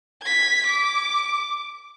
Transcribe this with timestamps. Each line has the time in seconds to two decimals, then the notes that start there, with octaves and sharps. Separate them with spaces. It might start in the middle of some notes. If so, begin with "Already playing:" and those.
0.23 G#6 B6
0.66 D6